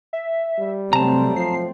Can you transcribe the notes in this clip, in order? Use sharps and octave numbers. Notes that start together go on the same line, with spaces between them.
E5
G3
C3 F#3 A3 C4 A5 A#5
F3 C7